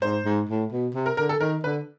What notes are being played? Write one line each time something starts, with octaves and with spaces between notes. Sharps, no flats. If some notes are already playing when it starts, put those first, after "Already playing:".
G#2 C5
G#2
A2
B2
C3
A#4
D3 A#4
A4
D#3 A#4
D3 B4